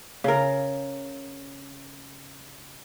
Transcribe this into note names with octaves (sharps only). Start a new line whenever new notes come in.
C#3 A#4